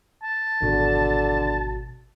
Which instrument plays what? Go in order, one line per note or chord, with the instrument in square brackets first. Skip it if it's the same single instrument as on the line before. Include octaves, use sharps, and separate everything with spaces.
[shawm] A5
[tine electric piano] G#1 B2 F#4 [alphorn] D3